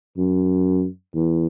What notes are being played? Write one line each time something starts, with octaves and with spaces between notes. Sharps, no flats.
F#2
E2